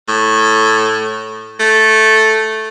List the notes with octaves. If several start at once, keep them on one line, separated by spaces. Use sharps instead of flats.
A2
A3